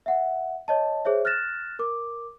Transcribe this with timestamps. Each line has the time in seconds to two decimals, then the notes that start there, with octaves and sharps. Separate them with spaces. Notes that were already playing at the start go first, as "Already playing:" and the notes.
0.06 E5 F#5
0.68 C#5 D#5 A5
1.05 G#4 C5 C#5 E5
1.25 F6 F#6 A6 A#6 E7
1.79 A#4 D6